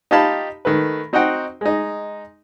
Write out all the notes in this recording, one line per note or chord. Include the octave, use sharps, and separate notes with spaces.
D#4 F4 G4 F5 A5 B5
D#3 A3 B4
C4 D#4 F#4 C5 F#5 G5
G#3 D#4